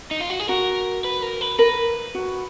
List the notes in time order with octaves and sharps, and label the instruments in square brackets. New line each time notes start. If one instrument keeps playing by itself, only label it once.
[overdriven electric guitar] D#4
F4
F#4
G#4
[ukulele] F#4 [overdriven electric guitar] A#4
[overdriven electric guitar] B4
A#4
B4
[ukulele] A#4 [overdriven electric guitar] B4
[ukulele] F#4